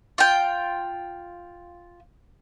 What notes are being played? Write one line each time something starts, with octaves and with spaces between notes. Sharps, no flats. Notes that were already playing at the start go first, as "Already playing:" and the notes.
F4 G5